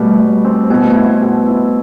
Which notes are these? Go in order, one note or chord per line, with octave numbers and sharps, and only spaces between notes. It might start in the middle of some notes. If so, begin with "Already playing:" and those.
Already playing: B2 G3 A3
G3
C4
B2 B3
A3
B3
E4
B2
E4